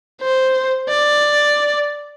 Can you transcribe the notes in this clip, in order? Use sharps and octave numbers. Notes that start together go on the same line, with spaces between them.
C5
D5